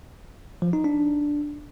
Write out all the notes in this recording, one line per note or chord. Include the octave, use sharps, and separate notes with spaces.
F3
D#4
D4